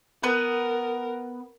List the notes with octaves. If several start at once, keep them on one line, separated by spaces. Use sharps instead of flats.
B3 A#4 B4